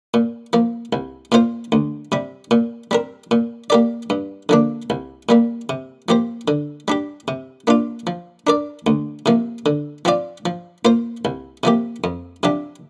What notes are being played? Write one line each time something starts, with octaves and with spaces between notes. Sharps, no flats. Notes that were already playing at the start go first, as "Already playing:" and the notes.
A#2
F3 A#3
C2
A#2 A#3 F4 C5
D2
C3 G3
A#2
G3 C4 A#4
A#2
A#3 G4 A#4 D5
G2
D3 F3 A#3 D4
C2
A#2 G3 A#3
C3
F3 A#3 G4 C5
D3
G3 D4 G4
C3
A#3 D4 F4
F3
D4 A#4 D5
D2
C3 F3 A#3
D3
F3 C4 F4 D5
F3
A#3 F4 C5
C2
C3 F3 A#3 G4
F2
C3 F3 D4 G4